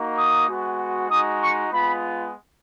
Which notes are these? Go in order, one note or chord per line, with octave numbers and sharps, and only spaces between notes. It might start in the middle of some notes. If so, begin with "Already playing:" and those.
Already playing: A#3 D#4 F#4
D#6
G#3 B3 F#4
G#3 D#4 F#4 D#6
C#6
G#3 B3 F4 B5